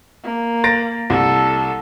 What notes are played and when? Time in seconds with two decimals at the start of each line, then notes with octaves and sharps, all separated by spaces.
0.24 A#3
0.64 A6 A#6 D7
1.10 C2 A4